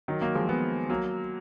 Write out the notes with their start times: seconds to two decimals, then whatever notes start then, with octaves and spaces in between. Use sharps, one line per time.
0.08 D#3 F#3
0.22 F#3 A#3
0.35 F3 G#3
0.49 G#3 B3
0.90 F#3 A#3